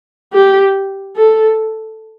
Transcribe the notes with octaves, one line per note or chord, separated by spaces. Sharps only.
G4
A4